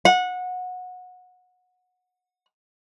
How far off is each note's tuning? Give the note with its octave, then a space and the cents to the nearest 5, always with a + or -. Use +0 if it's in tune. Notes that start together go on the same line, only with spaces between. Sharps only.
F#5 -20